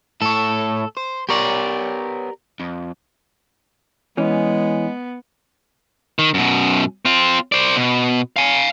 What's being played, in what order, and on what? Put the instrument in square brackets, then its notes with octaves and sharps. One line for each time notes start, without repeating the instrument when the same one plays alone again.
[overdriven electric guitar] A2 C#5 [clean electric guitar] A4
[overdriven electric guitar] C5
[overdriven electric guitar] B3 C#5 [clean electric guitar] G4 A#4 D5
[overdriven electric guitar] F2
[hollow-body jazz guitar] E3 C#4 [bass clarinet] G#3 [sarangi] B3
[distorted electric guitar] D#3
F#2 B2
C4 F4
C5 D5
B2
F5 G#5